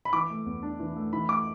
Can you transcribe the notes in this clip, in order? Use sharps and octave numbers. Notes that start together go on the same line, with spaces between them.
B5
E3 D6
A3
E2
D4
E3
A3
E3 B5
A3 D6